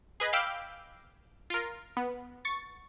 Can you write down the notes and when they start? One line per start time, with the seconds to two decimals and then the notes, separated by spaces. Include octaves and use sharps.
0.20 G#4 B4 D#5
0.33 F5 G5 B5 D6 E6 G6
1.50 F4 A#4
1.97 B3
2.45 C#6 A6